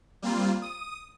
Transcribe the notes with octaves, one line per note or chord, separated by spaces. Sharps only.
G3 A#3 C4 F4
D#6